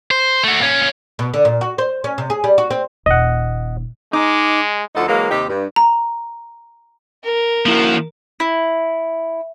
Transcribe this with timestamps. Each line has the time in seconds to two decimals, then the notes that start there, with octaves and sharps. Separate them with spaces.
0.11 C5
0.44 A3 F#4
0.60 A#2 C#4
1.19 B2
1.34 D3
1.45 A#2
1.61 F#4
1.78 C5
2.04 C#4
2.18 C3
2.30 G#4
2.44 G3
2.58 F#4
2.71 C4
3.06 D#1 A#3 D#5 F#5
4.13 G#3 D#4 D6
4.95 D2 F3 D#4 A4 F#5
5.08 E3 F#3 G#3 A#3
5.30 D#2 C3 D#4 G4
5.49 G2
5.76 A#5
7.24 A#4
7.66 F3 A#3 E4 F#4
8.40 E4